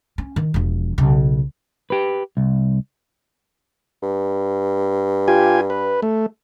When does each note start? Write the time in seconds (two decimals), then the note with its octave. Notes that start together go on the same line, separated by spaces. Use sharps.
0.18 C#4
0.36 D#3
0.54 E1 F3
0.98 B1 C#3
1.90 G4 B4
2.37 C2
4.03 G2
5.28 F4 G4 G#5
5.70 B4
6.02 A3